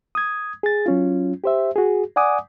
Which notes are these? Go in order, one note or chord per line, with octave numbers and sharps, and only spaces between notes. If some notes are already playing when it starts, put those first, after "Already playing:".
D#6 G#6
G#4 A6
F#3 C#4 F4
G4 C5 E5
F#4 G#4
D5 F#5 G#5 D6 D#6